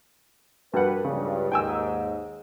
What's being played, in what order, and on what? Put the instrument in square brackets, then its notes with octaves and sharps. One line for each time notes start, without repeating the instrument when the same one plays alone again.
[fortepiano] G2 F#5 [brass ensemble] F#4 A#4 B4
[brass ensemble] C#2 G2 [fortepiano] C#3
[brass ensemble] D#2 G#2 [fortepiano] G5 G#5 E6